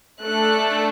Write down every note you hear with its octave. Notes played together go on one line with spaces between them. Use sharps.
A3 D4 A4 F#6